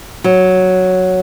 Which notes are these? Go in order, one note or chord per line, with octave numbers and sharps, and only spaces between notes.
F#3